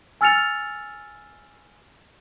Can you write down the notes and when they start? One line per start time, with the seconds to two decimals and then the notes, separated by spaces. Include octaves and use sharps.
0.21 G#5 E6 F6 A6 C#7 F7